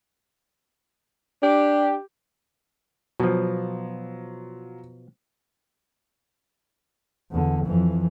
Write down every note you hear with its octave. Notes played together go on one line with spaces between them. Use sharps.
D4 G4
B2 F3 F#3 F4
E2 D3
F2 E3